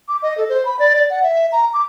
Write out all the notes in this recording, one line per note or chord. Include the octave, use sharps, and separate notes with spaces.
D6
D#5
A4
C5
B5
D5
D5
F#5
E5
A#5
D6